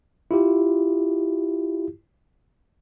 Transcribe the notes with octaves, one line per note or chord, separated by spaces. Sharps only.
E4 F4 G4